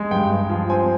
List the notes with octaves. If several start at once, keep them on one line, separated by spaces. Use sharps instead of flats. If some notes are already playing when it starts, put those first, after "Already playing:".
Already playing: G#3
G2 G5
G2
F3
C4 G#5